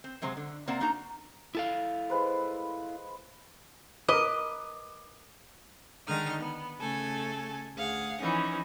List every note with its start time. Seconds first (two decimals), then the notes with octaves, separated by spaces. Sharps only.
0.04 C4
0.22 C3 F#3 G#3 C5
0.37 D3
0.67 C3 A#3 C4 D5 F#5 A#5
0.80 A#3 D4 D#4 F#4 A#5
1.55 E4 A4 F5
2.10 G#3 B4 C5
4.08 A#4 B4 D#5 D6
6.06 D3 D#3 G#3 D#4 F6
6.39 B3
6.79 C#3 A3 A4 G#5
7.75 D2 G#4 F5 F#5
8.20 E3 F3 C#4 D#4